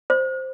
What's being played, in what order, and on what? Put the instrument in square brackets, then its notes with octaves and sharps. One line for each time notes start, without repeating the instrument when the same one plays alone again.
[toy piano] C5